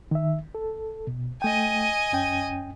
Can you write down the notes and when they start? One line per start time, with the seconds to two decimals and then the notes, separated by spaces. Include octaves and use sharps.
0.11 D#3 E5
0.55 A4
1.07 B2
1.42 A3 D#5 G5 G#5
2.12 F#2 C#4 G5